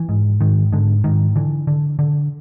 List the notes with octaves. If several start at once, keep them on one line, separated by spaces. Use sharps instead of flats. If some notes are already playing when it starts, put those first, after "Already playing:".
Already playing: E3
G#2
G#2 D#3
G#2 D3
G#2 D#3
D3 E3
D3
D3